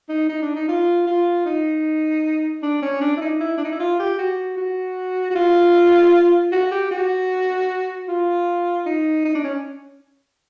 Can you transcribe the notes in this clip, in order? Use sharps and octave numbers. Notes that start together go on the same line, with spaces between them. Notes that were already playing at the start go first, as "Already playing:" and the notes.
D#4
D#4
D4
D#4
F4
F4
D#4
D4
C#4
D4
E4
D#4
E4
D4
D#4
E4
F4
G4
F#4
F#4
F#4
F4
F#4
G4
F#4
F4
D#4
D#4
D4
C#4